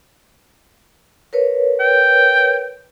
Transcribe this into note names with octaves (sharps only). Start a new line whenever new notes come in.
A#4 B4 C#5
G5